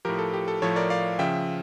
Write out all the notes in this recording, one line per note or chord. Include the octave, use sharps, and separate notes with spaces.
A2 F3 G4 A#4
A4
G4
A4
A2 F3 A4 C#5
A#4 D5
D5 F5
C#3 F3 E5 G5